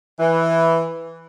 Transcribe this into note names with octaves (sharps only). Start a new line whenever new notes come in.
E3